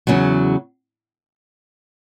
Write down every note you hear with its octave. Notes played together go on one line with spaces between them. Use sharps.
E2 C#3 F#3